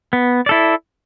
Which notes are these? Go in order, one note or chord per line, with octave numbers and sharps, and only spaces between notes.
B3
E4 A4 D5